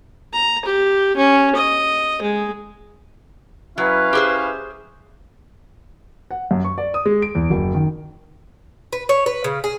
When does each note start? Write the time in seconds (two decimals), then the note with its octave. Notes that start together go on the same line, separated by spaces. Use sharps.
0.34 A#5
0.66 G4
1.17 C#4
1.56 D#5
2.22 G#3
3.78 F#3 C#4 E4 B4 F5
4.13 G4 G#4 C5
6.31 F#5
6.51 F#2
6.65 C#6
6.78 D5
6.94 D#6
7.06 G#3
7.22 D7
7.35 E2
7.50 F#1
7.74 D#3
8.93 B4
9.09 C#5
9.26 B4
9.44 C#3
9.64 G#4